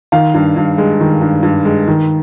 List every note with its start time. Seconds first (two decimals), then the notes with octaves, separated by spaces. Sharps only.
0.12 D#3 F5
0.34 G2
0.56 G2
0.78 G#3
1.01 D#3
1.21 G2
1.43 G2
1.65 G#3
1.88 D#3